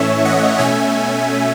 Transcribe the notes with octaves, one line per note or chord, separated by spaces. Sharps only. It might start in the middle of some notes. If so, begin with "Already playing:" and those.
Already playing: A2 E3 A3 C#4 C#5 E5
D#5 F#5
B2 A3 C#4 E5 G#5